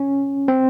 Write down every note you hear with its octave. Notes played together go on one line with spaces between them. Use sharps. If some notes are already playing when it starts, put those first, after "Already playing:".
Already playing: C#4
C4